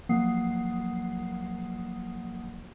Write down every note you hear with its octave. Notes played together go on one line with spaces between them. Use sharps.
F3 F#3 A#3 F#5 D#6 C7